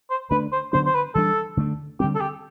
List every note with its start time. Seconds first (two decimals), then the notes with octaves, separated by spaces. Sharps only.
0.10 C5
0.30 D3 A3 D4 B4
0.52 C5
0.73 D3 F#3 B3 D4 C5
0.87 C5
0.95 B4
1.15 E3 G3 D4 A4
1.57 D3 A3 D4
2.00 D3 G3 C4 G4
2.15 A4
2.21 G4